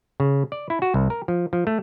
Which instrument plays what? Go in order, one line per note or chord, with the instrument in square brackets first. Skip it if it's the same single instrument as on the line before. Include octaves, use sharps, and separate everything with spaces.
[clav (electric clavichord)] C#3
D5
E4
F#4
C2
A#4
F3
F3
A3